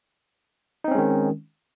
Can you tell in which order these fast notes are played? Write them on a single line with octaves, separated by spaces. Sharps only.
D#4 C4 C#4 G#3 D#3